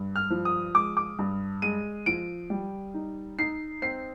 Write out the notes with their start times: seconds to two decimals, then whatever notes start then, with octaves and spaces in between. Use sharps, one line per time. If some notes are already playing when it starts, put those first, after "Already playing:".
Already playing: G2
0.16 F6
0.30 F3
0.45 D#6
0.74 G#3 D6
0.97 D6
1.19 G2
1.62 G#3 D#7
2.06 F3 D7
2.50 G3
2.94 D#4
3.39 D#4 C7
3.82 C4 C7